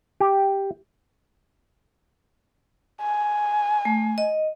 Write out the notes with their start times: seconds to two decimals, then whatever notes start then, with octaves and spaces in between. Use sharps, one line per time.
0.20 G4
3.01 G#5
3.85 A3
4.18 D#5